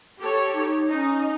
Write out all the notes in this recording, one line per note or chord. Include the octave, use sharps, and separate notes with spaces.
G4 A4 C#5
D#4
C#4 D#4